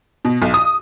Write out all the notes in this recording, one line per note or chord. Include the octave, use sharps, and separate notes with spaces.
B2
B1
D#6